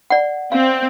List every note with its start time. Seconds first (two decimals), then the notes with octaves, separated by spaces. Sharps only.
0.10 D5 F#5
0.52 C4 F5